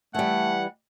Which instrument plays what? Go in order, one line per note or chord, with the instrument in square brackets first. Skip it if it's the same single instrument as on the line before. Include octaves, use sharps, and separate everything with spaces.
[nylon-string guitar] E3 G3 [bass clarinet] A3 [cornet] F#5